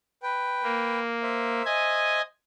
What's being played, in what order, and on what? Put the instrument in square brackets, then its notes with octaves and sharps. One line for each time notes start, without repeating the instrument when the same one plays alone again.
[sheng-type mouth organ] B4 G5
[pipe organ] A#3
[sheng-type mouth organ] C5 E5
[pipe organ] D#5 G#5